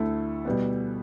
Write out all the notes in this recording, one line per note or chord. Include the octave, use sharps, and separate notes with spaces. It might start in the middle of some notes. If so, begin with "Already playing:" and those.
Already playing: D2 D3 A3 E4 A4
B2 G3 B3